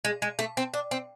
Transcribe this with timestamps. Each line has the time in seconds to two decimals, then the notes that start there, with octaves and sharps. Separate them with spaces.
0.05 G#3
0.22 G#3
0.39 A3
0.57 C4
0.74 D4
0.91 C4